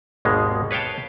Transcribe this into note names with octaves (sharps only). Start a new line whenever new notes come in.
G#1 D#2 B2 G#3 A#3
B4 C#5 F5 G5 A5